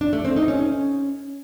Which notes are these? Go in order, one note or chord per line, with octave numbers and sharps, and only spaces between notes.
D4
A3
C4
D#4
C#4